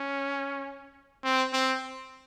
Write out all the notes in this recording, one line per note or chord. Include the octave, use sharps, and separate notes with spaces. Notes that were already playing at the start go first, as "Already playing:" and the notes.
Already playing: C#4
C4
C4